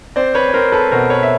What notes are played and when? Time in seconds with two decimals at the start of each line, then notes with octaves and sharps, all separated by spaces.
0.16 C4 C5 D5
0.35 B4 C#5
0.48 C#5
0.53 C4 A#4 C5
0.72 A4 B4
0.91 B2 A#4 C5
1.10 B4 C#5
1.23 E5